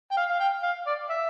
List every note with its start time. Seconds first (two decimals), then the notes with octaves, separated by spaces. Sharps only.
0.12 G5
0.17 F5
0.30 F5
0.40 G5
0.63 F5
0.87 D5
1.10 E5